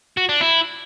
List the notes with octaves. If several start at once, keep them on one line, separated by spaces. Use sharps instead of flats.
F#4
D4
E4